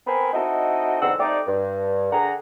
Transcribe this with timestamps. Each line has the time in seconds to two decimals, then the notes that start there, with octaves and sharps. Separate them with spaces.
0.07 B3 C4 A#4 C5 G#5 B5
0.33 C4 D#4 E4 F#4 A4 D#5
1.01 E2 G#2 D3 C4 F#5 E6
1.19 A3 C4 D#4 G4 D5
1.46 G2
2.12 D3 G#4 F#5 G5 A#5